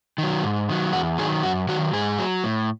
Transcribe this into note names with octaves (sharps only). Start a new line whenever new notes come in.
D#3 F#3
G#2
D#3 F#3
E2 F#4
D#3 F#3 G#4
F#2 F#4
D#3 F#3 F#4
G#2 G#4
F#3
A2